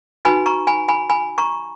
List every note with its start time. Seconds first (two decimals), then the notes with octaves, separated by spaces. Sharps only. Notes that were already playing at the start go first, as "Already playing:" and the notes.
0.25 D#4 F#4 B4 G#5 B5
0.46 A#5 C#6
0.67 G#5 B5
0.88 G#5 B5
1.10 G#5 B5
1.38 A#5 C#6